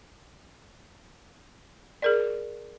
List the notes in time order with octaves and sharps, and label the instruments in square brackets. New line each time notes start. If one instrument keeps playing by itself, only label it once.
[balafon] G#4 A#4 D5